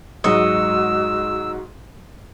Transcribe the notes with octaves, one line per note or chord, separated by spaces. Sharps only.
G#2 F#3 G#3 F#4 D#5 C#6 E6